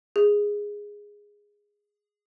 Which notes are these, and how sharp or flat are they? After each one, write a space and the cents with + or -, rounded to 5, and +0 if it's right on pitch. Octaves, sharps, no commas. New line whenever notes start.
G#4 -10